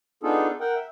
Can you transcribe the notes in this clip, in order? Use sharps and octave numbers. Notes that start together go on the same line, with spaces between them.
B3 D4 D#4 F4 G#4 A4
A#4 F#5 G5
E5